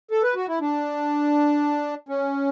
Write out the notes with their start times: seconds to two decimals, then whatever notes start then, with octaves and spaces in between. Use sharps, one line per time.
0.11 A4
0.23 B4
0.35 F#4
0.48 E4
0.61 D4
2.09 C#4